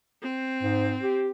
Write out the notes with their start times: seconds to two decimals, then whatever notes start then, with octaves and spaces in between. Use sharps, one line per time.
0.22 C4
0.63 G#2
1.02 G4